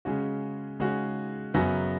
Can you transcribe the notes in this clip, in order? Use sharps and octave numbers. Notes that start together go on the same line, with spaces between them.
C#3 G#3 C#4 F#4
C#3 G#3 C#4 F#4
F#2 C#3 F#3 B3 F#4